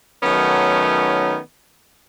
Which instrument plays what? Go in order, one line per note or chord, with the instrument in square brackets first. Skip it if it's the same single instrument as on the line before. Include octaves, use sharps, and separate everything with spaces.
[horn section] D#3 F#3 A3 B3 C#4 D#4